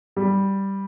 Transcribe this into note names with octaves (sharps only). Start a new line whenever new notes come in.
G3